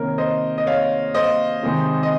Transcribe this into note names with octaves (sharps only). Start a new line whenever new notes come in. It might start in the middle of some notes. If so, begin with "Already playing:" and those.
Already playing: C3 D#3 A#3 A#4 C#5
C5 D#5
D#5
C#5 F5
C5 D#5
C3 D#3 G#3 C4
D#5